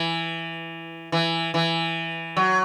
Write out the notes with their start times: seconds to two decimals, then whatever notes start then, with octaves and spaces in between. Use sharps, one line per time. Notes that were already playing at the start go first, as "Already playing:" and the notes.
Already playing: E3
1.12 E3
1.54 E3
2.37 F#3